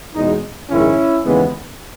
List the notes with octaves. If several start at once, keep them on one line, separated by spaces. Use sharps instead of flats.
E2 B2 G#3 D#4
A#1 G#2 D#3 G#3 C#4 E4
D#2 C#3 E3 G#3 B3